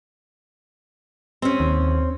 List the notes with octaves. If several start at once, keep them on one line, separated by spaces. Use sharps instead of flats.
C4 C#4
D#2